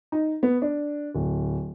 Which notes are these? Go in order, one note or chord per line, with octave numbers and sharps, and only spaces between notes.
D#4
B3
D4
D1